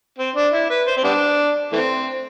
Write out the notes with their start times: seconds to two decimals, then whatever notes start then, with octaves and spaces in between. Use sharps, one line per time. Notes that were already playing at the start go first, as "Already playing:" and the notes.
0.18 C4
0.36 D4
0.53 E4
0.70 B4
0.87 C5
0.97 C4
1.04 G3 B3 D4
1.72 E3 A3 C4